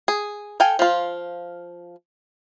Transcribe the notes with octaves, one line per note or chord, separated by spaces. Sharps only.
G#4
A4 F5 G5 G#5
F3 F4